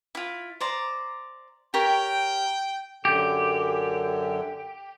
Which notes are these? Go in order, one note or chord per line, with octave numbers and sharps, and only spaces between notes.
E4 F4
C5 D5 A#5
G4 A#4 C#5 G5
F#2 D3 G4